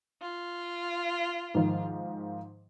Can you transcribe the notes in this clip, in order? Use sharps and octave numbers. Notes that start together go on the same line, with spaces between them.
F4
G#2 D#3 F3